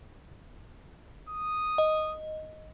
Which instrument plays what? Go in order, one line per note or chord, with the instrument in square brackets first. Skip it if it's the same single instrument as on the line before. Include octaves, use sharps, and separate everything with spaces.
[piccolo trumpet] D#6
[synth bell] D#5